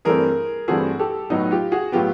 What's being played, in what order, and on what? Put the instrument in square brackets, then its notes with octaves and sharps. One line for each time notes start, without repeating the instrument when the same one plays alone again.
[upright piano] G2 E3 A3 C4 G#4 A#4
G2 E3 A3 C4 F#4 G#4
G4 A4
A2 F#3 B3 D#4
F4 G4
F#4 G#4
A2 F#3 B3 F4 G4